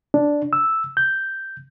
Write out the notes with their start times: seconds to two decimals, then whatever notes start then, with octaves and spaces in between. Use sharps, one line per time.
0.14 D4
0.53 E6
0.97 G6